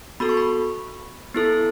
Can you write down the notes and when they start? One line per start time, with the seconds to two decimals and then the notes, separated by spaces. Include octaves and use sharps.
0.20 B3 F#4 A4 B5
0.29 C#6
0.37 B5
1.35 B3 E4 A4